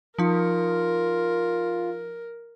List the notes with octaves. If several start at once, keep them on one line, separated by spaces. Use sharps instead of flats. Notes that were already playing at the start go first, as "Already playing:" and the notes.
F3 D#4 F4 A#4